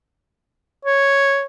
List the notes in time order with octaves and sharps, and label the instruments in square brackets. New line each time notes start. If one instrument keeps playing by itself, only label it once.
[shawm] C#5